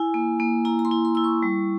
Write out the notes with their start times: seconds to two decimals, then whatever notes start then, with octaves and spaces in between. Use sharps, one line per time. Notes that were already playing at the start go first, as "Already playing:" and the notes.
Already playing: E4 G#5
0.14 A#3
0.40 A#3
0.65 E4 A#5
0.79 A#5
0.85 C6
0.91 E4
1.05 C6
1.15 E4 E6
1.24 C#6
1.43 G3